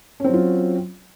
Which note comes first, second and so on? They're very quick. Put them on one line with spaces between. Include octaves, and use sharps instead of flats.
C#4 C4 F#3 F4